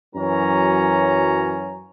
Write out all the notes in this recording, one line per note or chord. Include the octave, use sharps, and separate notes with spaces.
F#2 E3 F#3 C#4 A#5